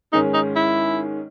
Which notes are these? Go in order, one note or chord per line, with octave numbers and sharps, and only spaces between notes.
G#2 D#3 G#3 C#4 D#4
D#4
E4